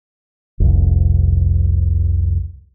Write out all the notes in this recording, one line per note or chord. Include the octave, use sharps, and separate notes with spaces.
F1 C2